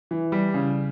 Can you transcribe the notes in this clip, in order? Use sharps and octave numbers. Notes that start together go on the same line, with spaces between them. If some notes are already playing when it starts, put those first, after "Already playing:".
E3
G3
C#3